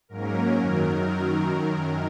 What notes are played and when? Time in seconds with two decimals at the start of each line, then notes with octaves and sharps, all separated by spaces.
0.09 G#2 F#3 A#3 C#4 A#4
0.53 F#2 D#3 F#3 A#4